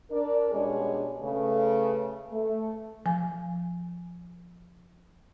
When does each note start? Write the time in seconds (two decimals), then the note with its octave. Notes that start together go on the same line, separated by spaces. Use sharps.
0.10 D4 A#4 D5
0.51 B2 G3 G#3 C#4 D4 G#4
1.22 C#3 A3 B4
2.30 A3
3.06 F3 G#5